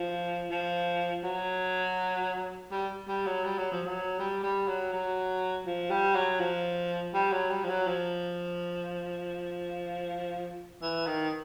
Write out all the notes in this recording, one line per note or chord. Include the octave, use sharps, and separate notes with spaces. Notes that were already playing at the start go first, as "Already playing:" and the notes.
Already playing: F3
F3
F#3
G3
G3
F#3
G3
F#3
F3
F#3
G3
G3
F#3
F#3
F3
G3
F#3
F3
G3
F#3
G3
F3
F#3
F3
E3
D#3